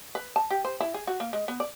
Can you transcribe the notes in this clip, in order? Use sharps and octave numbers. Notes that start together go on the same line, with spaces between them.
B4
A5
G4
C5
E4
G#4
F#4
A#3
G#3
B3
D5